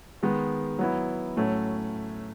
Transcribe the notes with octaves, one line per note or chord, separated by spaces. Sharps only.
D#3 G#3 B3
F#3 B3 E4
A2 F#3 A3 C#4